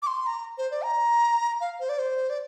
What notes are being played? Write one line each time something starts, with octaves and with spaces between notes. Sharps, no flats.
D6
C6
A#5
C5
D5
A#5
F5
C5
D5
C5
D5